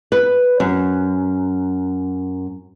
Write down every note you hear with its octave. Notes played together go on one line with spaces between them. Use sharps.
B4
F#2